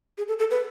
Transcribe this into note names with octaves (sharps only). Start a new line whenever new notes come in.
G#4
A4
A4
B4